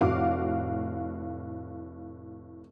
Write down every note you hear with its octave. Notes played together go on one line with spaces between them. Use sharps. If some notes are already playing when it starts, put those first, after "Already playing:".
F1 A2 F#4 F5 D6